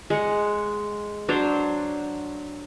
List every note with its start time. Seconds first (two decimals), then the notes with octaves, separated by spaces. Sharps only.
0.10 G#3 F#5
1.28 F#3 D4 C5 C#5